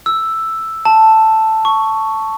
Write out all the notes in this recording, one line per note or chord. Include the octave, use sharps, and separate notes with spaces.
E6
A5
C#6